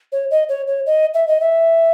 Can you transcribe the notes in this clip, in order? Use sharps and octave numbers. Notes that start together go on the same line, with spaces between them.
C#5
D#5
C#5
C#5
D#5
E5
D#5
E5